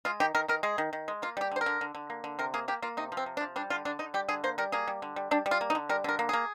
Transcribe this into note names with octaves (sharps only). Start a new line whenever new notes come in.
G#3 F4
D#3 G4
D#3 A#4
D#3 A#4
G#3 G#4
D#3
D#3
G#3
A#3 F4
G3 G4
D3 C5
A#4
D3
D3
D3
A#3
D3
C3 A#4
A#3 G#4
A#3 G4
A#3 F4
C3 D#4
F3
C4
C3
D4
F3
G3 D4
D3 F4
D3 D4
D3 D#4
G3 G4
D3 G#4
A#3 C5
G3 A#4
A#3 G#4
G3
D3
G3
G3 D4
G3
F4
A#3
D#4
D3
G3 A#4
D3 A#4
A#3
A#3 G#4